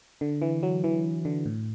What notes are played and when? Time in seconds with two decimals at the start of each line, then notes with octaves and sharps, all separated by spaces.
0.21 D3
0.42 E3
0.63 F#3
0.84 E3
1.25 D3
1.46 A2